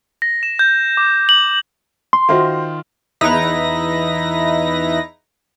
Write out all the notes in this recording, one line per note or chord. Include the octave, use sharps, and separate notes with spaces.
A#6
E7
G6
D6
F#7
C6
D#3 F4 F#4 C5 D#5 E5
E2 D#4 E4 B4 A#5 A#6